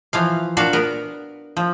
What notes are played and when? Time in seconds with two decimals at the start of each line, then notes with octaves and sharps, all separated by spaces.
0.13 E3 F3 F5
0.57 A#2 D4 F#4 F5
0.73 B3 A#4
1.57 F3